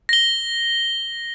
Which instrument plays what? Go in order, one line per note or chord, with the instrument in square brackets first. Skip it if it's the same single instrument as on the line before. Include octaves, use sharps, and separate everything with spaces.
[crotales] A#6 G7